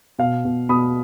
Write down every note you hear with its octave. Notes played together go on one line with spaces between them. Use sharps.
B2 F5
B2
B2 B5 D#6